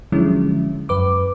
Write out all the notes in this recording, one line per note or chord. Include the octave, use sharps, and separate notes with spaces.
D3 F3 F#3 G#3 C#4 E4
F#2 B4 D6